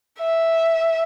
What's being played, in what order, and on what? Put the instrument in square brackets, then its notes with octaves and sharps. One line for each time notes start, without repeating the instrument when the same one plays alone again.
[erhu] E5